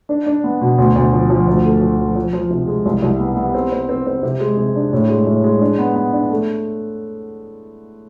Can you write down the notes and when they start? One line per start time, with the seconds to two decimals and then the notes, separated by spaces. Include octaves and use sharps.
0.09 D4
0.26 D4
0.44 B3
0.61 B2
0.78 D2
0.96 D2
1.13 F3
1.30 F3
1.48 D2
1.64 A3
1.81 F3
1.98 F3
2.16 F3
2.33 F3
2.50 C3
2.67 G#3
2.86 C2
3.02 C2
3.20 B3
3.36 B3
3.54 C4
3.72 C4
3.89 C4
4.07 C4
4.23 C3
4.40 G#3
4.57 C3
4.76 D4
4.93 A2
5.09 G#3
5.27 A2
5.44 G#3
5.61 D4
5.79 B3
5.96 B3
6.13 D4
6.30 A3